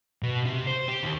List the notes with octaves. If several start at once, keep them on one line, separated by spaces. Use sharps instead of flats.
B2
C3
C5
G4
D#2